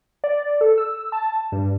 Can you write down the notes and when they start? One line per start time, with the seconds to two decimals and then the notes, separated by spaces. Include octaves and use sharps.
0.24 D5
0.61 A4
0.78 E6
1.12 A5
1.52 G2